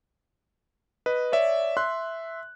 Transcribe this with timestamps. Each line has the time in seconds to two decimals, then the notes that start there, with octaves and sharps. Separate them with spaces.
1.06 B4 D#5
1.32 C#5 D5 E5
1.77 E5 C6 F#6